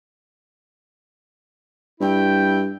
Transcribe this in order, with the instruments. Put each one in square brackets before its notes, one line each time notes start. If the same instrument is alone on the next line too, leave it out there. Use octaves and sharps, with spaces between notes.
[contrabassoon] G2 [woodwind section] E4 G5